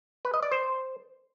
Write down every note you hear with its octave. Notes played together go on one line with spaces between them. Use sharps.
B4
D#5
D5
C5